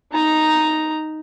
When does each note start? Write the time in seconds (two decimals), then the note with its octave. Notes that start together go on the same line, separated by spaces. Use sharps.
0.13 D#4 A#5